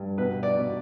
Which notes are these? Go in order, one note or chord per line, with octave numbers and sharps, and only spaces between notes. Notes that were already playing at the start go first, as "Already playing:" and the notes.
Already playing: G2
B2 B4
D5
B2